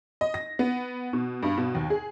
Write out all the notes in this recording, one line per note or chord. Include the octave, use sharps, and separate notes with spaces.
D#5
A#6
B3
B2
G2
B2
D#2
G#4